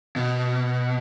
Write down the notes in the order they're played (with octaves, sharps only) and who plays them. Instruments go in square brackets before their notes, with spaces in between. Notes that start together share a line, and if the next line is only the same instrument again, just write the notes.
[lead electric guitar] B2